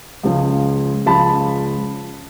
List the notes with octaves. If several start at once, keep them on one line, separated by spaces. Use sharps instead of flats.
C#2 C#3 F3
C#2 C#3 F3 A5 B5